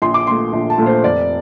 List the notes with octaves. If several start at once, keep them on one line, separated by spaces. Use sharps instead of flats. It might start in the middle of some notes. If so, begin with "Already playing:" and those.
A#1 C6
D6
A#2 A3 C6
A#1
A5
A#2 A3
C5
F1 D5